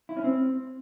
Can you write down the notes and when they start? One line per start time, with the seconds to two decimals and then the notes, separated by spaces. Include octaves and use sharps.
0.09 E4
0.17 C#4
0.24 C4